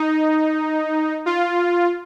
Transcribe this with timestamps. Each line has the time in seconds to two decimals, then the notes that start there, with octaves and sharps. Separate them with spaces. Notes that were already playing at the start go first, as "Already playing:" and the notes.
Already playing: D#4
1.26 F4